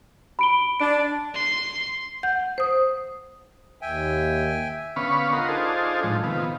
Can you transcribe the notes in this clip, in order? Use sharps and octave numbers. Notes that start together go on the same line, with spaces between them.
B5 D7 G7
D4 D7
C6
F#5 G6
C5 D#6
D#2 E5 G5 G#5
D3 B3 C#4 F5 B5 C#6
F4 A#4 D#5 F#5 C6
D4 D#4 F4 G#4 A4 C5
A2 F3 G#3
C3 D#3 B3 F4